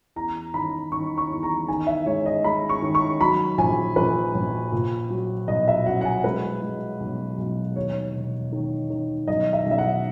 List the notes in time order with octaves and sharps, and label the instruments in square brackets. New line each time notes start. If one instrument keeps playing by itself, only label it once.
[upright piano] E2 A#5
D#3 B5
D#3 C#6
C#6
E2
A#5
D#3 G#5
E5
G#3 C#5
D#5
G#3 B5
C#6
D#3
C#6
F#3 B5
A#1 G#5
A#1 B4
A#1
A#2
F#3
B1 D#5
E5
F#3 F#5
F#5
G#5
G#3 B4
G#3
B1
B1
D#2 C#5
E1
D#3
D#3
B1 D#5
E5
B1
E5
F#5